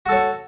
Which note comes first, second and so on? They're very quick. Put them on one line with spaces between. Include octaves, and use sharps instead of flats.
F#4 A4 C#5